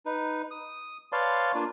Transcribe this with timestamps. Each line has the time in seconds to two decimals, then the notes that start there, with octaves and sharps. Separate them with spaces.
0.06 D#4 B4
0.51 D#6
1.12 B4 C#5 D5 F5 A5 C6
1.55 A#3 D4 F4